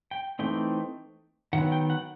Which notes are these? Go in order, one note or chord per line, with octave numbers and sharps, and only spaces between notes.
G5
E3 A3 C4 D#4 G5
D#3 F#3 B3 F#5
G5
F#5